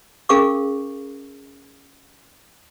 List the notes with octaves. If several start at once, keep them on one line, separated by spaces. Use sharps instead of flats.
C#4 G#4 A#4 F5 C#6 D6